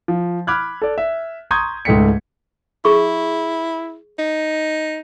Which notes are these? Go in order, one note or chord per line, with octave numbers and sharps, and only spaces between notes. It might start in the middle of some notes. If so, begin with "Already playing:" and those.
F3
B5 D6 F6 F#6 G#6
A4 D5
E5
A#5 C6 C#6 D#6 G6 G#6
C#2 G#2 A3 G5 B6 C#7
E4 G#4 C#6
D#4